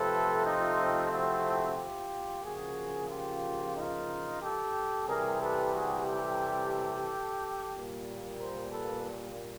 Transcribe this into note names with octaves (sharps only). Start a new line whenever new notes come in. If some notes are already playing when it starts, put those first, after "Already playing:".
Already playing: C3 F3 A3 C4 A4 B4
D#4 F4
E4 F#4
F4 G4
C#3 F3 A#3 F#4 G#4
F4 G4
D#4 F4
G4 A4
C3 E3 G3 G#4 A#4
A4 B4
F#4 G#4
G4 A4
A#2 G3 A#3
A#4 C5
A4 B4